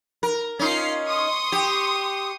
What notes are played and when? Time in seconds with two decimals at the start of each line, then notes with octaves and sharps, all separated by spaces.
0.23 A#4
0.59 C#4 D#4 F4 F6 C7
1.07 C6 C#6 D#6
1.52 G4